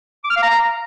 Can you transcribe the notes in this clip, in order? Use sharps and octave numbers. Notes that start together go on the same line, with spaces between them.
D6
F6
F5
A#5